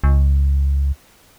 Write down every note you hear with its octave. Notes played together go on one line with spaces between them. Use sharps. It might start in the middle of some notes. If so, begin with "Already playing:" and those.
C#2